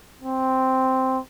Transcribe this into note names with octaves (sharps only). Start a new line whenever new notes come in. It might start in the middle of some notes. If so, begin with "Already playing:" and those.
C4